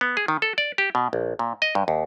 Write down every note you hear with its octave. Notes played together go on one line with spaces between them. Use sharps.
B3
G#4
D#3
A4
D5
G4
B2
A#1
A#2
D#5
G2
D#2